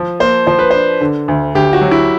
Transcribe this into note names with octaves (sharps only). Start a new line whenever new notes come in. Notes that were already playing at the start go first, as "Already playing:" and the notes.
Already playing: F3
A#3 C5
F3 C5
B4
D4 C5
D3
D2
D2 G4
F#4
F#3
E4